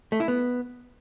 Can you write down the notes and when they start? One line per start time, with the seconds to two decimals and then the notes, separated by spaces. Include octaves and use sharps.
0.12 A3
0.20 E4
0.28 B3